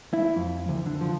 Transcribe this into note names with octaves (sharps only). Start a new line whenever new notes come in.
E4
F2
D2
D3
F3